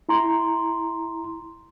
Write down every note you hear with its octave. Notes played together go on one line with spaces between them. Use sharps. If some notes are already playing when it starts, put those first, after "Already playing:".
E4 A#5 C6